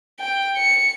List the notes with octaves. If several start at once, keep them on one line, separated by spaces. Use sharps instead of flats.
G5
C#7